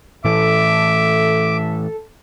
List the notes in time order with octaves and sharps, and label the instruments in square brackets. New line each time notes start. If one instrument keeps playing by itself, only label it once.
[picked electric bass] A2 E3 [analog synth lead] A4 [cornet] E5 [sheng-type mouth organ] D6